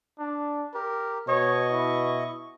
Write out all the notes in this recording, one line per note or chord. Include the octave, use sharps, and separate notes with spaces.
D4
G4 A#4
B2 C#5 D#5 C#6
E4